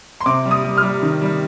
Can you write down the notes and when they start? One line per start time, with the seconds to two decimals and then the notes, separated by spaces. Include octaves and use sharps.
0.21 C6
0.26 C3 D6
0.45 G3
0.51 D#6
0.64 G3
0.77 F6
0.83 G3
1.03 D#3
1.22 G3